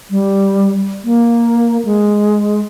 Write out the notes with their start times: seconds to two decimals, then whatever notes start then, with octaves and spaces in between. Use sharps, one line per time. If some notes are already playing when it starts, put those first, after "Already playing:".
0.11 G3
1.05 A#3
1.85 G#3